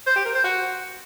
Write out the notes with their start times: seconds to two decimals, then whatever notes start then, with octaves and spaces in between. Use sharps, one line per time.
0.07 C5
0.16 G4
0.25 A#4
0.35 C5
0.44 F#4